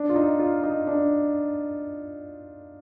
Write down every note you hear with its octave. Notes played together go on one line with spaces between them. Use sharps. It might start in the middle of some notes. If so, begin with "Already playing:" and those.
Already playing: D4
F4
D#4
F4
D#4
D4